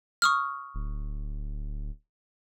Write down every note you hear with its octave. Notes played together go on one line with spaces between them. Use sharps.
C#6 D#6 F6
D1